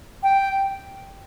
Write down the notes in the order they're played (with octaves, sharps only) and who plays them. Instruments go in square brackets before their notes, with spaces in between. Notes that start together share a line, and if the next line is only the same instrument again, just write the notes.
[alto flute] G5